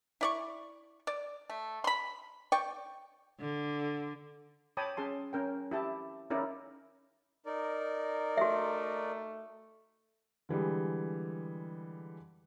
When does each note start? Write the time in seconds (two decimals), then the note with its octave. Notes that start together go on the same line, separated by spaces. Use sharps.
0.21 E4 D5 C#6
1.07 D5
1.50 A3
1.84 B5 C6
2.52 D5 G5 C#6
3.40 D3
4.77 C#5 G5 A5 B5 D6 D#6
4.97 C#4 G#4 A5 C6
5.33 C#4 A#4 G5
5.71 E4 G4 A5
6.30 C#4 D#4 E4 A#4 D5
7.46 D#4 A#4 D5
8.37 A3 F#4 E5
10.49 D3 E3 G3 G#3